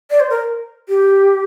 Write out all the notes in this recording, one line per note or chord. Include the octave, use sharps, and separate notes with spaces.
D5
C5
A#4
G4